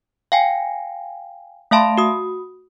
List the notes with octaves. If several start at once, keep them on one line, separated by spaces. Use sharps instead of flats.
F5 G5 G#5
A3 E5 F5 A5 B5 C6
F#4 D#6